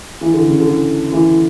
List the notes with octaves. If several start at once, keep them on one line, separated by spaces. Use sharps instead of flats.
E3
D3
C#3
D3
E3